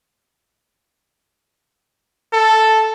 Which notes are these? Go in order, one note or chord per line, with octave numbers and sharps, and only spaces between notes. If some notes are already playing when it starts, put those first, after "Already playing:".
A4